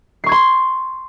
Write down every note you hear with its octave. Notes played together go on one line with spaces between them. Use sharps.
C6 C#6 G#6 C7